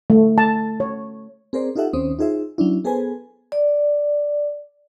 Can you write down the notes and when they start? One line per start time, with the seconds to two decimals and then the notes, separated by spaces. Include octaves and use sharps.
0.10 A3
0.38 A5
0.80 C#5
1.53 C4 G#4 A#4 C5 D5
1.76 D#4 F4 G4 A4 E5 F#5
1.93 D#2 D#3 C4 C#4 C5 D#6
2.19 D#4 F4 G#4 C5 E5
2.58 F#3 C#4 D4 E4
2.84 B3 G#4 A4 B4 C5 G#5
3.52 D5